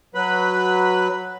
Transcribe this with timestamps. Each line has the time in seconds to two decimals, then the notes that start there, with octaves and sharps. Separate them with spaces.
0.15 F#3 B4 B5